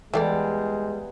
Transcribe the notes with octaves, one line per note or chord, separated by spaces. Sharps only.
E2 G3 G#3 E4 A4 D5